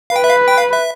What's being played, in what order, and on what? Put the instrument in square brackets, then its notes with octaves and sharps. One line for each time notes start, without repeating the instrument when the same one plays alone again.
[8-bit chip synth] F5
[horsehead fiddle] B4 [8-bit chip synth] G5
[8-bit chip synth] E5
F5
G5
F5
E5